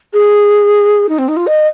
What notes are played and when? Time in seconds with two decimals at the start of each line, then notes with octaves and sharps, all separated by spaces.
0.13 G#4
1.09 D#4
1.18 C4
1.28 D#4
1.36 F4
1.47 D#5